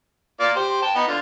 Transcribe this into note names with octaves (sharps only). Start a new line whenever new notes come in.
A#3 F4 D5
G4 C5
G5 A5
B3 D#4
D3 F4